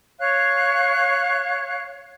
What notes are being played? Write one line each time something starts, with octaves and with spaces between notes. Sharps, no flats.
C#5 F5 F#6